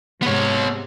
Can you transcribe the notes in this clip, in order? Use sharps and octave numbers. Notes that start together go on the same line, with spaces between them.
G#2 C3 B3 C#5